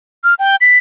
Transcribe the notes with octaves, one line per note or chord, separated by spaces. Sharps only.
F6
G5
B6